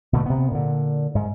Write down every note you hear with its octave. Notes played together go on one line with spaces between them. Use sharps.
B2 D3 G#3 A3
C3 B3
A#2 D3
G#2